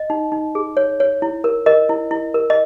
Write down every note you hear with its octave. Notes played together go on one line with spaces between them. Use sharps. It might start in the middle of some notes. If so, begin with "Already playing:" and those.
Already playing: D#5
D#4
D#4
G#4
C#5
C#5
E4
A#4
A#4 D#5
E4
E4
A#4
D#5